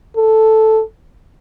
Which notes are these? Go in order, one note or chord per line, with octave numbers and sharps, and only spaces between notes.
A4